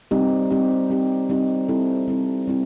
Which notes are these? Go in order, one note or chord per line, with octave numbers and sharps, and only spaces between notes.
G3 C4 D#4 G4
G3 C4 D#4 G4
G3 C4 D#4 G4
G3 C4 D#4 G4
G3 C4 E4 A4
G3 C4 E4 A4
G3 C4 E4